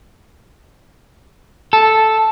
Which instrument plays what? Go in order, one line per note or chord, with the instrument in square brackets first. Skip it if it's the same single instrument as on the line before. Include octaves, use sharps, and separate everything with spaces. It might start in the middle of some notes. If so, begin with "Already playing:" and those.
[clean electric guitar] A4